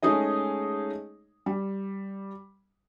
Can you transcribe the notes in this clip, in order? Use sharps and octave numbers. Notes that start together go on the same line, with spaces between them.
G#3 A3 C#4 D#4 G#4 D#5
G3